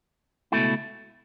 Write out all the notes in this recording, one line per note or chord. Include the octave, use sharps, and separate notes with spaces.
C#2 B2 A3 E4